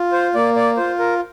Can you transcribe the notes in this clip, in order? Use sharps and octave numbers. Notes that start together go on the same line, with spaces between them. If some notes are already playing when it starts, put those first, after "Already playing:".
Already playing: F4
C5
A#3 D5
D5
F4 C5
A#4